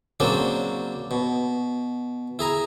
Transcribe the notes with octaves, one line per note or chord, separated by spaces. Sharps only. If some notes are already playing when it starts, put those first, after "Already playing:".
C#3 F#3 A#3 C4 D4
B2
E4 G#4 A#5